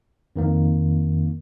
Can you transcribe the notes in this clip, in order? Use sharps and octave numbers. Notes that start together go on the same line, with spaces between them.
F2 D#3 A#3